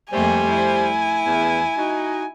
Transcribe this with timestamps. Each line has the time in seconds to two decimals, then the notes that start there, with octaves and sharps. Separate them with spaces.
0.12 F2 G3 A3 A#3 C5 G#5
0.49 E4
1.26 E2
1.77 D#4 F#4